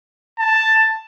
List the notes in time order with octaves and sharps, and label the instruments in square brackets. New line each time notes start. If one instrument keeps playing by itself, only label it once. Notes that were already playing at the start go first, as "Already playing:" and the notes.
[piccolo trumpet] A5